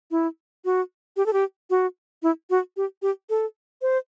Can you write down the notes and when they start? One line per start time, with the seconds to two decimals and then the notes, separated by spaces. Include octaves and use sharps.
0.11 E4
0.65 F#4
1.17 G4
1.26 A4
1.33 G4
1.70 F#4
2.23 E4
2.50 F#4
2.77 G4
3.02 G4
3.30 A4
3.82 C5